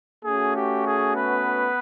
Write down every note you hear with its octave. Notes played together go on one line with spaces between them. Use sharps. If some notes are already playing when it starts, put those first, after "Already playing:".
A3 C#4 F#4 G#4
G4
G#4
B3 B4